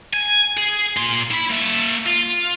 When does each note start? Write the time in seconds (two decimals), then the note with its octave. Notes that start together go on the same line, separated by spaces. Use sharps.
0.13 G#5
0.58 G#4
0.97 A#2 C6
1.31 E4 B5
1.50 A#3 E5
2.06 F4